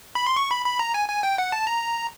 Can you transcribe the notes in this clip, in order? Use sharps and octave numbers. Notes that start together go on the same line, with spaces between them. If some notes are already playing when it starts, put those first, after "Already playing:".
B5
C6
C#6
B5
B5
A#5
G#5
G#5
G5
F#5
A5
A#5